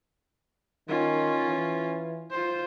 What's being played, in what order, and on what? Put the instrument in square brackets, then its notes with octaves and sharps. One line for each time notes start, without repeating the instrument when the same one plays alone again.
[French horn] D#3 [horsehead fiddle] C#4 F4
[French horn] E3
[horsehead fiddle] F4 C5